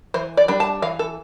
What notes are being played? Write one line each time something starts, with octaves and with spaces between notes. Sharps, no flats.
E3 C5
D5
G3 D4
A5
E3 F5
A4